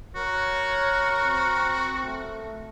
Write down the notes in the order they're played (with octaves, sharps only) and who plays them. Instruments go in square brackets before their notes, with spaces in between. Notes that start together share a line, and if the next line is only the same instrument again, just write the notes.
[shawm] F#4 [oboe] A#4 [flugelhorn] C#5
[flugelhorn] C4
A3